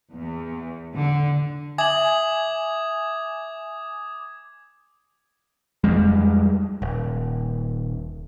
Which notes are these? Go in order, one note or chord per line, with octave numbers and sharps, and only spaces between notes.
E2
D3
E5 G#5 D6 D#6 G#6 F#7
F2 G3 G#3
D#1